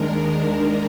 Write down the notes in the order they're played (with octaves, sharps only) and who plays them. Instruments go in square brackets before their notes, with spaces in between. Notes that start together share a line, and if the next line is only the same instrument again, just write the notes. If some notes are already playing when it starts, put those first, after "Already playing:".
Already playing: [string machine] D#2 D#3 G#3 D4 A#4